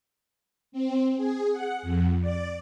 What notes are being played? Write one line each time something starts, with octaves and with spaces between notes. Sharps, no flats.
C4
G#4
F#5
F2
D5